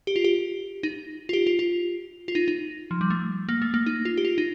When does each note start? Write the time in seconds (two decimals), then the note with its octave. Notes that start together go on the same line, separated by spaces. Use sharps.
0.07 G4
0.16 F4
0.24 G4
0.83 D#4
1.29 F4
1.33 G4
1.47 F4
1.59 F4
2.28 F4
2.35 D#4
2.48 D#4
2.91 F3
3.01 G3
3.10 A3
3.49 A#3
3.62 A3
3.74 A#3
3.86 D#4
4.05 F4
4.18 G4
4.25 F4
4.38 D#4